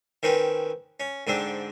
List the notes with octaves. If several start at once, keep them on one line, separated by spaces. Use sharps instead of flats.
D#3 C4 C#4 B4
C#4
G#2 D3 C4 D4